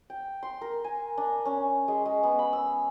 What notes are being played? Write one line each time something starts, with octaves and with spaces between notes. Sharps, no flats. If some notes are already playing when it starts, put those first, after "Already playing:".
G5
C6
A#4
G#5
D4
C#4
G#3
G#3
B3
B5
E6